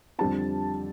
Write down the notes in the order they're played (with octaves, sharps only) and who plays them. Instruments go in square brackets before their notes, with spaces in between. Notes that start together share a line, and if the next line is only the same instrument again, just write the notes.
[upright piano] F2 D3 G3 C4 A5